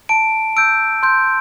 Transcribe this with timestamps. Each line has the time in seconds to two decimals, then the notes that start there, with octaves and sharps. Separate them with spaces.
0.09 A5 D7
0.57 E6 G6 D7
1.03 C6 G6